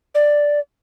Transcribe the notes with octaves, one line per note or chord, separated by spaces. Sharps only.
D5